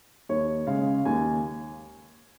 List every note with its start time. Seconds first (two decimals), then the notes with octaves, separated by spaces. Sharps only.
0.29 D#2 C#5
0.67 C#3 G#3 F5
1.05 D#2 G#5